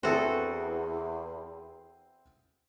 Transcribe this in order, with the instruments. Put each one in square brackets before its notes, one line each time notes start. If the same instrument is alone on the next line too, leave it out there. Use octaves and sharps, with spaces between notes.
[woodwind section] E2 [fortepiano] C4 E4 G#4 [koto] F#4 A4